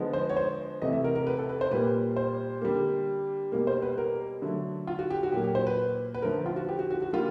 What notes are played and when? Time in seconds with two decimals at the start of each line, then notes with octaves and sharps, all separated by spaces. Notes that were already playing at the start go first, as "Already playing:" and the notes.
Already playing: D3 F3 G#3 B3
0.13 C5
0.30 C#5
0.37 C5
0.82 C3 E3 A3 D#5
0.93 E5
1.04 A#4
1.15 A#4
1.27 B4
1.38 A4
1.49 B4
1.61 C5
1.71 A#2 G3 A#3 B4
2.16 C5
2.62 D3 G3 A#3
3.52 B2 G3 A#3
3.67 C5
3.82 B4
3.98 A#4
4.42 D3 F#3 A3
4.87 F4
4.99 F#4
5.10 G4
5.23 F#4
5.32 A#2 F#3 A#3 G4
5.44 G4
5.55 C5
5.67 B4
6.14 B4
6.22 D3 F3 A3 A#4
6.46 F4
6.56 F#4
6.69 G4
6.79 F#4
6.91 F#4
7.02 F#4
7.13 D3 G3 A#3 F4